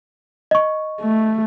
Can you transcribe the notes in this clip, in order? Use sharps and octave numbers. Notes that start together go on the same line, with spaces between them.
D#5 C#6
A3